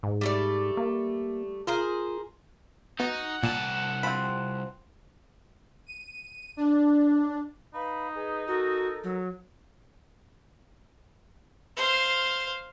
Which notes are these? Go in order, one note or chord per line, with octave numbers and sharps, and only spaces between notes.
G#2
G3 A3 D5
A#3
F4 G#4 A#4 C5
B3 D#4 F#4 F#5
C2 A#2 A5
F3 C4 B5
D#7
D4
D#4 B4 F5 B5
G#4 B4 D#5
F#4 A4 A#4
F#3
C5 F5